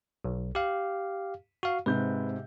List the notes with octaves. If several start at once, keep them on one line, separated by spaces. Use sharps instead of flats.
B1
G4 F5
F#4 F5
G#2 C3 B4 G6